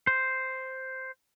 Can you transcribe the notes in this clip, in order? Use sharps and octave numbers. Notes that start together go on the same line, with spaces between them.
C5